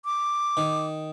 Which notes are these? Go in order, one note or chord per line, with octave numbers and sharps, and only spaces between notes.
D6
D#3